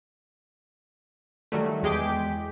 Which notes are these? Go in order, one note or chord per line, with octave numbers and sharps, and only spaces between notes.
D#3 F#3 G3 A3
E2 G#3 G#4 G5 D6 B6